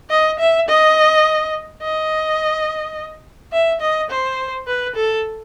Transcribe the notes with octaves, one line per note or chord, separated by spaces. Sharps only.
D#5
E5
D#5
D#5
E5
D#5
C5
B4
A4